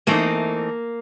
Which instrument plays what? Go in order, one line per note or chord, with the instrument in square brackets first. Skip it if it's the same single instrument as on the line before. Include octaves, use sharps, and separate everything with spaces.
[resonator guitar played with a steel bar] E3 A3 C4 D#4 [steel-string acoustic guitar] A#3